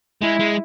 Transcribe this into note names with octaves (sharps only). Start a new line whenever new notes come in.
G#3 E4
G#3